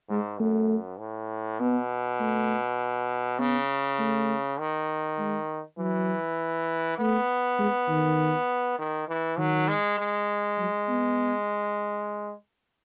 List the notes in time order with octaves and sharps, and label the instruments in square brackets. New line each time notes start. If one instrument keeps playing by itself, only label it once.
[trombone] G#2 [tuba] G#3
[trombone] F#2 [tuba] A3
[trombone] A2
[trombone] B2 [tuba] B3
[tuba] A3
[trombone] C#3 [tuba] B3
[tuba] A3
[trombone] D#3
[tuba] G#3
[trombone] E3 [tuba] F#3
[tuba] A3 [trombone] B3
[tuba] G#3
D#3
[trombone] D#3
E3
[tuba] D#3 [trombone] F#3
[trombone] G#3
G#3
[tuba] F#3
B3